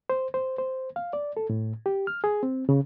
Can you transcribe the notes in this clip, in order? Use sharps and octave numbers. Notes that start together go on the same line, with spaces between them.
C5
C5
C5
F5
D5
A4
A2
G4
F6
G#4
C4
C#3